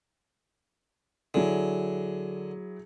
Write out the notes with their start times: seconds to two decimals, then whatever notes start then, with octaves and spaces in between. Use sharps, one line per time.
1.34 D3 F#3 E4 G#4